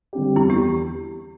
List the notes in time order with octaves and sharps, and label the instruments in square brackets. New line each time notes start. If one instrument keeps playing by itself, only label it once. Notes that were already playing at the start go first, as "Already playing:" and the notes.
[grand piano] D3 G3 C4 G4
[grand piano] E2 [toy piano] E4
[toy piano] G4